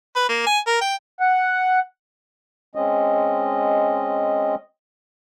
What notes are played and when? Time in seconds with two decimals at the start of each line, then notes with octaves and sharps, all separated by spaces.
0.16 B4
0.29 A#3
0.47 G#5
0.67 A#4
0.81 G5
1.20 F#5
2.75 G#3 C4 C#4 D#5